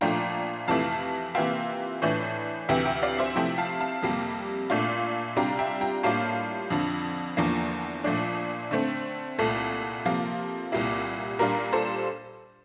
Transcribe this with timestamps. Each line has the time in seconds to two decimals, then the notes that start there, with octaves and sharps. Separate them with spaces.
0.01 A#2 F3 A3 D4 F4 G5 A#5
0.68 F2 C3 E3 A3 E4 F5 A5
1.35 C3 E3 A#3 F4 E5 G5
2.02 A2 E3 A3 D4
2.69 D2 C3 E3 E5 G5
2.85 E5 G5
3.03 D5 F5
3.19 C5 E5
3.36 C3 F3 A3 E4 E5 G5
3.58 F5 A5
3.80 F5 A5
4.03 F2 C3 G3 A#3
4.70 A#2 A3 D4 F4
5.37 C3 G3 D4 F4 G5 A#5
5.59 E5 G5
5.81 G5 A#5
6.03 A2 G3 A#3 D4 F4 F5 A5
6.70 F2 D3 F3
7.37 E2 D3 F3 A#3
8.04 A#2 F3 A3 D4
8.71 D3 A3 C4
9.38 C2 A#2 A3 A4
10.05 C3 F3 A#3 F4
10.72 C2 A#2 G3 A#3 E4
11.39 A#2 G3 D4 F4 A#4
11.73 A4 C5